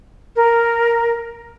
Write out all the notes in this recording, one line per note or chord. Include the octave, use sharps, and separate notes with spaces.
A#4